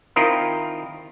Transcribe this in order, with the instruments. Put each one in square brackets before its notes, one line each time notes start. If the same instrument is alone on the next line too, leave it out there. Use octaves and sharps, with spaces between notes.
[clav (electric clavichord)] D#3 C4 E4 F4 A#4 D#5